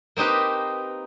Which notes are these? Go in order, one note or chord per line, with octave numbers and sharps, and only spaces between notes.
A#3 C4 D#4 G4 B4